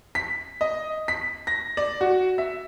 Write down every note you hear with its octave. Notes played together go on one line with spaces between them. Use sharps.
B6
D#5
B6
A#6
D5
F#4
E5